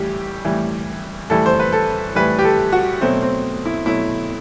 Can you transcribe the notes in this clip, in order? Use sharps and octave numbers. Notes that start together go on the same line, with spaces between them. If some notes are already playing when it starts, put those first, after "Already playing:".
Already playing: A2 E3 G3 G4
A2 E3 G3
A2 E3 G3 A4
C5
B4
A4
A2 E3 G3 B4
G4
A4
F#4
B2 F#3 A3 C4
C4
E4
B2 F#3 A3 E4